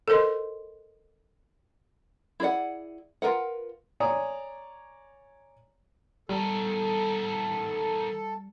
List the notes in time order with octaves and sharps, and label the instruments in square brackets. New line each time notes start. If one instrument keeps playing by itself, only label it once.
[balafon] A4 A#4 C5 D#5 C6
[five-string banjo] E4 G#4 A4 D5 F#5
F4 F#4 A#4 B4 F#5
[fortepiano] C#5 D5 G#5 A#5 D#6
[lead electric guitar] E2 D#3 [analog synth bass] G3 [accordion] A4